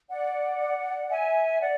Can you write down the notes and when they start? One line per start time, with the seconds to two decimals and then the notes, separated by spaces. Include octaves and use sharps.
0.10 D5 F#5
1.10 E5 G#5
1.61 D5 F#5